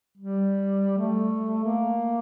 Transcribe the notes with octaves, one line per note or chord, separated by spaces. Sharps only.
G3
A3
A#3